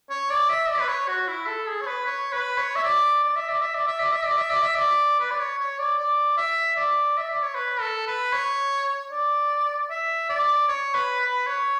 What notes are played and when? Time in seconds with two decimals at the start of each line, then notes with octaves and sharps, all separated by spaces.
0.10 C#5
0.30 D5
0.49 E5
0.69 D5
0.80 B4
0.88 C#5
1.08 F#4
1.27 E4
1.47 A4
1.67 G#4
1.81 C#5
1.87 B4
2.06 C#5
2.32 B4
2.58 C#5
2.75 E5
2.84 D5
3.24 D5
3.36 E5
3.49 D5
3.62 E5
3.74 D5
3.87 E5
3.99 D5
4.12 E5
4.25 D5
4.38 E5
4.50 D5
4.63 E5
4.76 D5
5.20 B4
5.31 D5
5.39 C#5
5.59 C#5
5.78 D5
5.98 D5
6.37 E5
6.77 D5
7.17 E5
7.30 D5
7.42 C#5
7.55 B4
7.81 A4
8.07 B4
8.33 C#5
9.11 D5
9.90 E5
10.29 D5
10.68 C#5
10.94 B4
11.21 B4
11.47 C#5